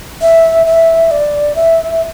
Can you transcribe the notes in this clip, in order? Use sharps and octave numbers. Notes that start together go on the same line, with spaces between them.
E5
E5
D5
E5